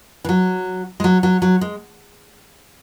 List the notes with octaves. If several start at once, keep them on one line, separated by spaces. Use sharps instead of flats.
E3
F#3
G#3
F#3
F#3
F#3
G#3